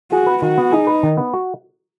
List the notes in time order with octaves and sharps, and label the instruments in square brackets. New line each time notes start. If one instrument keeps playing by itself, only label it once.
[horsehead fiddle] F#4 [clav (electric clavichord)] G#4
[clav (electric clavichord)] B4
[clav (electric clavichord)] D#3 [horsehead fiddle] F#4
[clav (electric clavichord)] B3
[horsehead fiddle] D#4 [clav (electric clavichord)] G#4
[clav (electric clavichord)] B4
D#3
B3
F#4